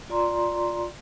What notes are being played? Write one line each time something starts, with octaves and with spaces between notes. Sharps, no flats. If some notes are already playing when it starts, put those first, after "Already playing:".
F4 D5 A#5 C6